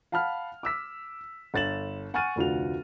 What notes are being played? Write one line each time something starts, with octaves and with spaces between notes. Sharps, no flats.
F5 F#5 A5 B5 F6
D6 E6 B6
G1 C#5 A6 E7 F#7
F#5 G#5 C#6 F6 A6 D#7
F1 D2 F4 F#4 F7